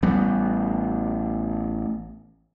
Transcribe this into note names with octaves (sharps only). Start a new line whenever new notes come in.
A1 G3 B3